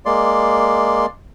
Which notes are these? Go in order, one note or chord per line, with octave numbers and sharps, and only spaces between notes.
G#3 A#3 D5 C6